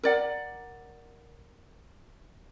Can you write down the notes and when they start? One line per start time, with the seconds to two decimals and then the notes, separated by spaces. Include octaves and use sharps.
0.03 A#4 D5 F#5